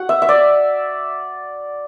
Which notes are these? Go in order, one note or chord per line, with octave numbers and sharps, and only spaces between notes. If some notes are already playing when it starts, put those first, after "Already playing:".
Already playing: F#4 F#5
E5
E5
D5